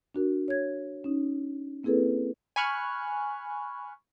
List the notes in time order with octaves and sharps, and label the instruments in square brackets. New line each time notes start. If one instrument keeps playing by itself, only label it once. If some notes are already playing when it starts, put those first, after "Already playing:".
[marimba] D4 F#4 A#4
C#5 G#6
C#4 D#4
A#3 C4 E4 G#4 A4 B4
[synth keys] G#5 B5 C#6 F6 F#6